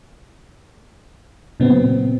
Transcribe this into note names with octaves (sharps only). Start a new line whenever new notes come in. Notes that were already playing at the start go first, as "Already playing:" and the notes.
A#2 C#3 F#3 B3 C4